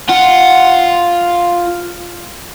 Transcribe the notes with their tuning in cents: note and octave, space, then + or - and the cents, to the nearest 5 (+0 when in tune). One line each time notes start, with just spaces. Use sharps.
F4 +0 F#5 +0